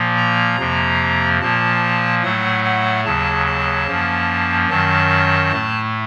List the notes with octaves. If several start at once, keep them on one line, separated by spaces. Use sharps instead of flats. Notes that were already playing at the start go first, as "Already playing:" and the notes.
Already playing: A#2 F3 A#3
A#5
F2 C3 F3 A#3
A#2 F3 A#3 A5
A2 F#3 A3 F#5
F#5
D#2 C#3 F#3 A5
A5
F#2 F3 A#3
F#2 D#3 F#3 A5
A2 A3